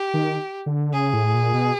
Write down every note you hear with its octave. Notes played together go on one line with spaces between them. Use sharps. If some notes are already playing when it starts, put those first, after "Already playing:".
Already playing: G4
D#3
D3
C#3 G#4
A2
A#2
B2